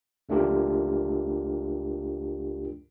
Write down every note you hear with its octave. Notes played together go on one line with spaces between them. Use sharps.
C#2 A3 D4 F4 G4 A#4